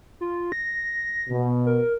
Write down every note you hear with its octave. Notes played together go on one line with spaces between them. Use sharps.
F4
A#6
B2
A#4